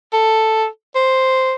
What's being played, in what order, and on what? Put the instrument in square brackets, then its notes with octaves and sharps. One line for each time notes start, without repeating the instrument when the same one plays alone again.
[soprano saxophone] A4
C5